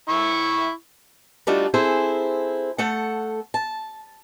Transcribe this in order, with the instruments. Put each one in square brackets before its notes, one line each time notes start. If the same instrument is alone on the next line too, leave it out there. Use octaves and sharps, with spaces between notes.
[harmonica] E4 E5 C#6
[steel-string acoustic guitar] G3 A3 D4 D#4 F4 F#4
C4 E4 G#4 A4 C5
A3 A4 F#5
A5